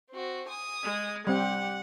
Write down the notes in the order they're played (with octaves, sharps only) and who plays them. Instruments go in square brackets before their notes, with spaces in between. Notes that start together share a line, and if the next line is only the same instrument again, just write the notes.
[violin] C4 F#4
G#5 D#6
[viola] G#3
[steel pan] G3 C4 [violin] G4 [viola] F#5